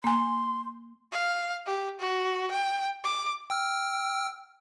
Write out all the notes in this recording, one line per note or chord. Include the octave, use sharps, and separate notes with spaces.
A#3 G#5 C6
F5
G4
F#4
G5
D6
G5 E6 F6